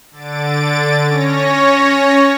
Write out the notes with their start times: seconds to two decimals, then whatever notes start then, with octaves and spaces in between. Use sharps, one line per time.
0.11 D3 A6 D7
1.06 C#4 C#5 A#6